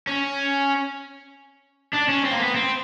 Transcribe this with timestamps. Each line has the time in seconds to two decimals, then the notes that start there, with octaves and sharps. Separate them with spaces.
0.07 C#4
1.94 D4
2.09 C#4
2.25 C4
2.32 A#3
2.40 B3
2.55 C4